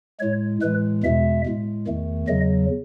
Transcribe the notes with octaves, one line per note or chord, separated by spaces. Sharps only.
A2 G#3 C#5
A2 E3 G#3 B4
E2 B2 G#3 E5
A2 G#3
E2 D#3 A3
E2 C#3 F#3 D#5